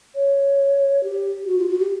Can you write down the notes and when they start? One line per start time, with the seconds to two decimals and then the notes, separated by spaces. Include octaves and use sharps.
0.15 C#5
1.03 G4
1.47 F#4
1.59 F4
1.69 F#4
1.80 G4